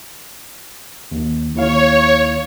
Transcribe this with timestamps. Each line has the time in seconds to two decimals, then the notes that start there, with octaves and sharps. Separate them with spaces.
1.11 D#2
1.55 D#2 E4 C#5 F5